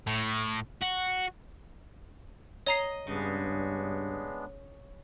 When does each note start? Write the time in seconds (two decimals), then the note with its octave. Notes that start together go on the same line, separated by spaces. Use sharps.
0.07 A2
0.82 F#4
2.66 C#5 D#5 A#5 C7
3.07 G2 C#3 G#3 B3 D4